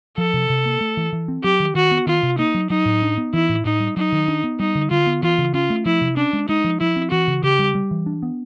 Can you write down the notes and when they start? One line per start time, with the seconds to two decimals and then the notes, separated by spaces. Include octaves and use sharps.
0.18 F3 A4
0.34 C3
0.50 C3
0.65 A#3
0.81 A3
0.97 E3
1.13 E3
1.28 C4
1.44 F#3 G4
1.60 D#3
1.75 D#3 F#4
1.91 B3
2.07 D#3 F4
2.23 C3
2.38 A#3 D#4
2.54 F#3
2.70 F#3 D#4
2.85 A2
3.02 D4
3.18 B3
3.33 E3 E4
3.49 A2
3.65 A2 D#4
3.80 G3
3.97 F#3 D#4
4.12 D#3
4.28 D4
4.44 B3
4.60 G3 D#4
4.75 D3
4.91 D3 F4
5.07 B3
5.23 E3 F4
5.38 C#3
5.54 C#4 F4
5.70 A3
5.86 F3 E4
6.01 C3
6.17 C#4 D4
6.33 G#3
6.48 G#3 D#4
6.64 F3
6.80 F3 E4
6.96 C4
7.11 E3 F#4
7.28 C#3
7.43 C#3 G4
7.59 G3
7.75 G3
7.91 E3
8.06 D4
8.23 B3